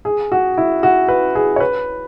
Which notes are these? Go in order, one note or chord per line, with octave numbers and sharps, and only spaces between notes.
G#4
F#4
E4
F#4
B4
G#4
C#5
B4